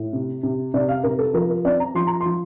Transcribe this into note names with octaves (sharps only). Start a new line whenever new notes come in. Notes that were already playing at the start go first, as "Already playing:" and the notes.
Already playing: A2
C3
C3
C3 D5
F5
C3 A#4
A4
F3 A#4
A#4
C4 D5
A#5
F3 C6
A#5
F3 C6